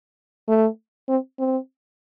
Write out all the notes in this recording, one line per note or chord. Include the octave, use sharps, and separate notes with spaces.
A3
C4
C4